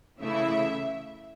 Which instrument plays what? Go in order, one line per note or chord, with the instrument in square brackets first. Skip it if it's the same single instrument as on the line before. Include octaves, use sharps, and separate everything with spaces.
[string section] C#3 E3 A3 E4 E5